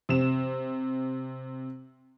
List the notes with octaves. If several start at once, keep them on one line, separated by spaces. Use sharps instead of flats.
C3 E7